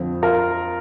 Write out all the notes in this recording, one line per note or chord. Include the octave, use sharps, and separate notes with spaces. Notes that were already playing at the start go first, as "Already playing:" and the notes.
Already playing: F2 D3 F3 C4
F4 A#4